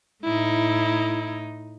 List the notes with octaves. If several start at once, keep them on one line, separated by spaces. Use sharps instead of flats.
A2 D#4 E4